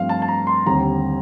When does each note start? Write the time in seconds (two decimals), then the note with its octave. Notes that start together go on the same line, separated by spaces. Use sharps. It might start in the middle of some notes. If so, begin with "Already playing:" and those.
Already playing: G2 F3 A3 C4 F5
0.09 A5
0.22 A5
0.28 A#5
0.47 C6
0.66 D#2 D3 G3 C4 A#5